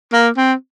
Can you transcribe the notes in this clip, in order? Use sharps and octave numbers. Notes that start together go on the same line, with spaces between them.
A#3
C4